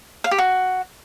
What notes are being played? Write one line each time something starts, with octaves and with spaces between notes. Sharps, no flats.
F5
G4
F#4